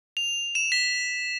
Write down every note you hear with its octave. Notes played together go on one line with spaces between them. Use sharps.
F7
E7
B6